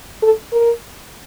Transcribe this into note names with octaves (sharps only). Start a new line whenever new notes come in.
A4
A#4